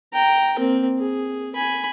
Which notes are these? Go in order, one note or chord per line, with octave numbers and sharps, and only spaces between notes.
G5 A#5
A#3 C4
G#4
G#5 B5